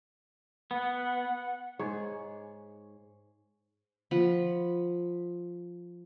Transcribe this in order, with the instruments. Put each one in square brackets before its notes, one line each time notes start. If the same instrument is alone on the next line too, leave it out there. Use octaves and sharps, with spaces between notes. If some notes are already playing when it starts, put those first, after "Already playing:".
[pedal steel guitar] B3 [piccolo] F#5
[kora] G#2 G#4 C#5
[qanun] F3 F#5 B5